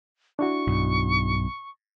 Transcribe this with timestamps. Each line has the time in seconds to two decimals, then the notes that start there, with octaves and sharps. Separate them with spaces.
0.39 D4 E4 F#4 C#6
0.67 B1 G2